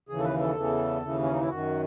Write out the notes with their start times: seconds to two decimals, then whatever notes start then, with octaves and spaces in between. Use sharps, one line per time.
0.09 D#2 C#3 E3 G#4
0.19 A4
0.24 B4
0.40 A4
0.55 E2 C#3 E3
1.02 D#2 C#3 E3
1.23 C#4
1.31 D#4
1.41 E4
1.49 F#2 D#3 F#4